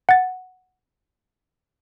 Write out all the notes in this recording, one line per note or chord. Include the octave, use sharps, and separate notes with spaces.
F#5 A6